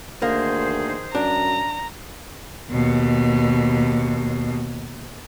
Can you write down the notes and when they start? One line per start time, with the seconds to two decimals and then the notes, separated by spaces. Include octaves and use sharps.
0.22 D2 D#3 A#3 G#4 C5
1.15 F#2 D4 A#5
2.72 D#2 B2